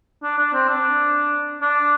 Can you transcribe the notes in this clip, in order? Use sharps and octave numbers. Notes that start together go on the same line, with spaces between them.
D4
D4
C4
D4
D4